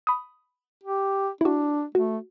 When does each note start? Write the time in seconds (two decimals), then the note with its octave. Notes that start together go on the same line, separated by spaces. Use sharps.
0.07 B5 D#6
0.84 G4
1.41 D4 E4 F#4
1.95 A3 F#4